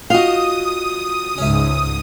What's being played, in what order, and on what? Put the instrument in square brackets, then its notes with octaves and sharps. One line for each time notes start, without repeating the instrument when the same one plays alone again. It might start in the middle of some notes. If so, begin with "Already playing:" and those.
[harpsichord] D#4 F4 [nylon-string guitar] F#4 F5 [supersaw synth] D#6
[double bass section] C#2 G#2 [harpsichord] C#4 E5